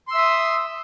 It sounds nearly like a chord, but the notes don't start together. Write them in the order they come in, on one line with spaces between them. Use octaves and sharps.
C6 E6 E5 D#6